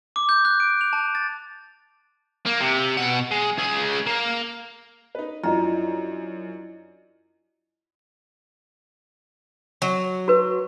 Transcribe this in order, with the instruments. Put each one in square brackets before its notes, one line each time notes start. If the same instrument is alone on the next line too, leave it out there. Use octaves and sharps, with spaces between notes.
[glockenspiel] D6
G6
F#6
D7
F7
A5
A6
[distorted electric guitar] A#3
C3
B2 F#5
G#3
C#2 G#4
A#3
[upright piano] D#4 B4
[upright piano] F#2 F3 [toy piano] D4 A#5 [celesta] E4 D5 D#5 [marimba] F4
[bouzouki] F#3
[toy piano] F#4 B4